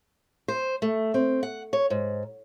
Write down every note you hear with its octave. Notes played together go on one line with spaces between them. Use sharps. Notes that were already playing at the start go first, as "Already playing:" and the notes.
C5
A3
C4
F#5
C#5
G#2